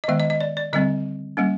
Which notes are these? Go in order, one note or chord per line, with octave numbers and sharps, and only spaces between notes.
D#5
D#3 G#3 B3 E5
D#5
D#5
D5
D5
D3 G3 C4 D#5
G3 A#3 C#4